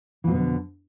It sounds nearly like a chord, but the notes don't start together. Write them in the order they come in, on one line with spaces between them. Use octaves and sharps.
E3 B2 G#2 D3 F2